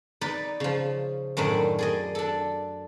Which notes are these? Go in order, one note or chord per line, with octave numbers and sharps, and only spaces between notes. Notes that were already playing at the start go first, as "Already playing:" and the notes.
D#4 B4 D5
C#3 F3
F#2 A2 D#3 D4
G#4 D5 D#5
D4 A4